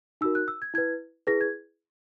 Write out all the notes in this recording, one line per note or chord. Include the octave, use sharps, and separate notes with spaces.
D#4 F#4 A#4 E6
F#6
E6
G#6
E4 B4 G#6
E4 G#4 B4 A#6
G#6